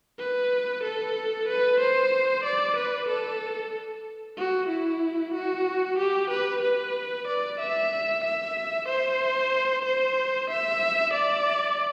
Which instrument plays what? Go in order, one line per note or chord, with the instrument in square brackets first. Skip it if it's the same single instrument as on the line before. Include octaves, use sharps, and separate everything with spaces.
[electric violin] B4
A4
B4
C5
D5
B4
A4
F#4
E4
F#4
G4
B4
B4
D5
E5
E5
C5
C5
E5
D5